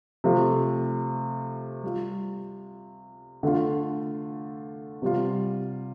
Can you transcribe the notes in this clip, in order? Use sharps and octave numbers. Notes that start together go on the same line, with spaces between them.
C3 F3 A3 F4
G3 F4
D3 A3 F4
C3 G3 F4